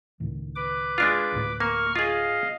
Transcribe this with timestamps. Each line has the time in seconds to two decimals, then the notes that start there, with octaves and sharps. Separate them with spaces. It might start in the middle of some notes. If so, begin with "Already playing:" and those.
0.20 C#2 A2 D#3
0.55 B4 D6
0.98 G#3 D4 F4
1.32 D2 A2
1.60 A#3 C#6 F6
1.96 F4 G#4 D#5 F5